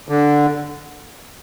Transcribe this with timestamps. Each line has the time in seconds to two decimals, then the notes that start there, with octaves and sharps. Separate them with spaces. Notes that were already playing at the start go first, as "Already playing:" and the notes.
0.09 D3